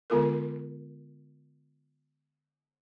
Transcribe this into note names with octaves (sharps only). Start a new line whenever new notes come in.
D3 G#3 B3 F4 A4 A#4